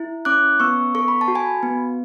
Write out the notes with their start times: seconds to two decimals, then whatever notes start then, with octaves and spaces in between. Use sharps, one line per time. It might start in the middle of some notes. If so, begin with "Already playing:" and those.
Already playing: E4
0.25 C#4 D6 F#6
0.60 B3 C#6 E6
0.95 A4 C#6
1.08 B5
1.21 A5
1.28 F#4
1.35 G#5 B5
1.63 B3